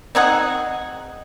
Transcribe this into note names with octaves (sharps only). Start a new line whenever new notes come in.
C4 D#4 G#4 F#5